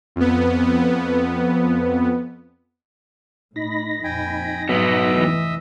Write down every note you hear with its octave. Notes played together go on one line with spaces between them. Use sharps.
F2 B3
A2 D#4 B5 A#6
F2 A#2 G5 G#5
G#2 F#3 B3 D#5 E5
F1 E3